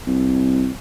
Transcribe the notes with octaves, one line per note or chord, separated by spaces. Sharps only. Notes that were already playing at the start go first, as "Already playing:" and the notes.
C2